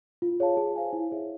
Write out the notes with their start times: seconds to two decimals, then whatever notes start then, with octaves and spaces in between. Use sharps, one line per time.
0.22 F4
0.40 G#4 C#5 F5 A5
0.57 G#4
0.76 C5 F5 G#5
0.93 E4
1.12 G#4 C#5 E5